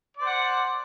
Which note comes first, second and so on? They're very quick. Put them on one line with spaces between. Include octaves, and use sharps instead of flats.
D5 C5 F#5